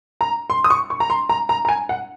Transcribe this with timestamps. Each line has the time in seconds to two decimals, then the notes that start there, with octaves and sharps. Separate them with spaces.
0.21 A#5
0.50 C6
0.64 D#6
0.70 C#6
0.90 C#6
1.00 A#5
1.10 C6
1.29 A#5
1.49 A#5
1.65 A#5
1.69 G#5
1.89 F#5